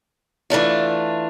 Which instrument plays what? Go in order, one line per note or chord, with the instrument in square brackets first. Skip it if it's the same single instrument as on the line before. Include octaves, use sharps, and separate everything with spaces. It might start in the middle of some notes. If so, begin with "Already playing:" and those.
[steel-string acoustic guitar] E3 A3 D4 F4